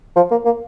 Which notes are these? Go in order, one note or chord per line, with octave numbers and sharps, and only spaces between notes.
F3
A#3
A#3